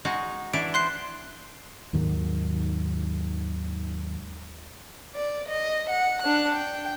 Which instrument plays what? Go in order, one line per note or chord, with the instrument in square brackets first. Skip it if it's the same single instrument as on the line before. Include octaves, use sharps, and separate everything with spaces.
[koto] G#3 D#4 F#4
[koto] E3 D4 E4 [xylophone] D7
[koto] C5 [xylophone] C6 F#6 C7
[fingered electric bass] D#2 G#2 D#3 F#3
[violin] D5
D#5
F#5
D4 F#6
G5